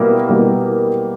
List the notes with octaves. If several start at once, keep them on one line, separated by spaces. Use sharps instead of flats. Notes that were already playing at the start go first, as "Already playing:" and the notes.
Already playing: B2 G3 A#3 E4 A#4
B2 G3 A#3 E4 A#4